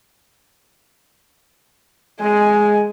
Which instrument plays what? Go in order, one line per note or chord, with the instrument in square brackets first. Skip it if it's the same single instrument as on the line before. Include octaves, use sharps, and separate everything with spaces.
[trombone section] G#3 [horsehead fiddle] G#5